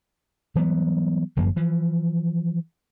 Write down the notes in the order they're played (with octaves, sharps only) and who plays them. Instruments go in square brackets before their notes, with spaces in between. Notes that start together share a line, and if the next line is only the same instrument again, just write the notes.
[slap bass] E3 F#3 G3 B3
G1 F#2 F3 A#3
E3 F3